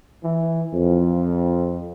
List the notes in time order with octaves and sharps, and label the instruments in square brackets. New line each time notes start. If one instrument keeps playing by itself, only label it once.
[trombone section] E3
F2